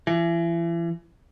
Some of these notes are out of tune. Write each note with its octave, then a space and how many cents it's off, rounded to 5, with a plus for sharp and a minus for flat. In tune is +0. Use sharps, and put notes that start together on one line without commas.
E3 +35